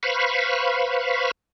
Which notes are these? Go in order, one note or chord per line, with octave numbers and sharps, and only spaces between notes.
B4 C5 F5 B5 C#6